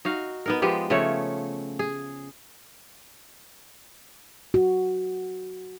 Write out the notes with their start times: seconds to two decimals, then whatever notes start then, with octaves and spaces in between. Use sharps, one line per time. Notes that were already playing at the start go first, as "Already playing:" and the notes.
0.05 D#4 F#4 F5
0.46 B3 D#4 A#4
0.62 F3 G#3 B3 G4
0.90 C#3 F3 A3 C#5
1.79 G#4
4.54 F#4